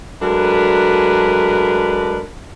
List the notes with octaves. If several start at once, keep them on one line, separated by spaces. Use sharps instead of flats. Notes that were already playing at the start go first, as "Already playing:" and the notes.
F#3 G#3 A3 D4 A#4 B4